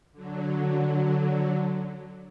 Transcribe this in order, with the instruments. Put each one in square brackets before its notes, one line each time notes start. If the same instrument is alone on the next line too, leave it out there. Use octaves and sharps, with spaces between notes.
[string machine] D3 F#3